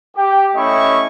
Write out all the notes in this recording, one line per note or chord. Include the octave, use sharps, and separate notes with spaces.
G4
A3 C#4 E4 D#5 C#6